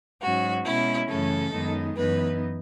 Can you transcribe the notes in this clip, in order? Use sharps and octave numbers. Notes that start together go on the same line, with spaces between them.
G#2 F#3 C#4 F#4
B2 G#3 C#4 E4
F#2 C#3 E3 A3 C#4 A4
F#2 D#3 G#3 B3 D#4
F#2 E3 B3 D#4 B4